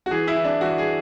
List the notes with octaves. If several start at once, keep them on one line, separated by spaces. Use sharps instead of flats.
F#4
E3 G#4
E4
E3
D4
E3 F#4
G#4